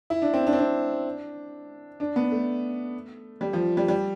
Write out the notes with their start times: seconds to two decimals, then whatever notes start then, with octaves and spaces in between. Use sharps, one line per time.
0.10 E4
0.22 D4
0.34 C4
0.47 D4
0.53 C4
0.58 D4
2.00 D4
2.16 B3
2.32 A3
3.41 G3
3.53 F3
3.77 G3
3.88 G3